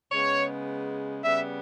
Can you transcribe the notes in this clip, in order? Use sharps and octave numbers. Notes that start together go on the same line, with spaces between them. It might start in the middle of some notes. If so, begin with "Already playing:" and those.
C#3 G#3 B3 C#5
C#3 G3 B3 E5